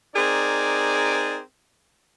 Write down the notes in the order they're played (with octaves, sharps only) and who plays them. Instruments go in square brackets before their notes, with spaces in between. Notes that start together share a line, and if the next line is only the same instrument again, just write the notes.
[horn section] C4 D#4 G#4 A#4 D5